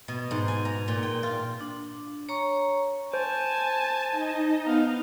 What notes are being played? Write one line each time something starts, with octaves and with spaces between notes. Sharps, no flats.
B2
G#2
G#5
A#5
A#2
G5
F4
D4
C#5 A#5 C#6
C5 G#5 A5
D#4 D#5
B3 F5